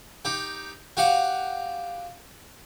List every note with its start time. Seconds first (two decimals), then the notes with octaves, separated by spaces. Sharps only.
0.25 D#4 G4
0.97 F#4 G4 F5 F#5